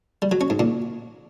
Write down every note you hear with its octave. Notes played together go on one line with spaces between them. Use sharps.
G3
F#3
C#4
G#2
A#2